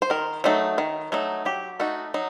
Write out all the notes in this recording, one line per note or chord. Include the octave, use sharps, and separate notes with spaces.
C5
D#3 A#4
F#3 A3 D#4
D#3
F#3 A3 D#4
F#3 G4
A3 D#4 F#4
F#3 D#4